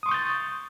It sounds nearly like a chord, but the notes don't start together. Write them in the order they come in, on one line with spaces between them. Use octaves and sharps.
D#6 C6 C#6 G6 A6